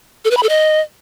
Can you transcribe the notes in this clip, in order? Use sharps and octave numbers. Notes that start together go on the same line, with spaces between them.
A4
B4
B5
A4
D#5